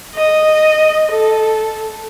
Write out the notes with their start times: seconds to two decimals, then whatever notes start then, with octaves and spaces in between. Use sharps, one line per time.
0.15 D#5
1.12 A4